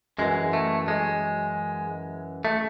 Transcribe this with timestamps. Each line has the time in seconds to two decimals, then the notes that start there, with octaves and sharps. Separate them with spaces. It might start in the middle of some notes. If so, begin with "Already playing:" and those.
0.19 F#2 E3 G#3
0.53 A3
0.88 G#3
2.45 A3